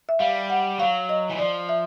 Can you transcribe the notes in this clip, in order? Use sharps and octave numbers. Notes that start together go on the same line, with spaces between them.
E5
G3 F5
F#5
F#3 F5
D#5
E3
F3 D5
E5